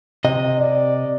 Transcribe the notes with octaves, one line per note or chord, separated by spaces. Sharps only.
C3 D#5
D5